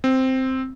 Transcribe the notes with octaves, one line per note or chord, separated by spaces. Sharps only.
C4